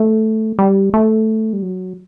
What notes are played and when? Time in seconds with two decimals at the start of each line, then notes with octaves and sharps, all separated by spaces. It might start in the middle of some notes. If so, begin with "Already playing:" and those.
Already playing: A3
0.59 G3
0.94 A3
1.53 G3
1.62 F#3